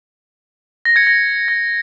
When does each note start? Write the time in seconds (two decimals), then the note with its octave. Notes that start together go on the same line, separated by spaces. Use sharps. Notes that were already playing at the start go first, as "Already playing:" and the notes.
0.85 A#6
0.96 G#6 C#7
1.07 A#6
1.48 A#6